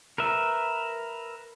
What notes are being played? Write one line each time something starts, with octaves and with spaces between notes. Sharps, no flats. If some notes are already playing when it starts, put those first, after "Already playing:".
A#4 B4 E5